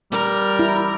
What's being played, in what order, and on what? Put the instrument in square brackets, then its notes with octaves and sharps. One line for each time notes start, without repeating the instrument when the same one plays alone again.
[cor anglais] G3 [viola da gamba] A#4
[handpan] E4